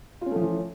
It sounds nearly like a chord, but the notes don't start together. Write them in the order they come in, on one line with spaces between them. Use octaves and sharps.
F4 C#4 A3 F3 E3